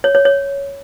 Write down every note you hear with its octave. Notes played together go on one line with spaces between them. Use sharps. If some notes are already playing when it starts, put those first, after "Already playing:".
C#5
C#5
C#5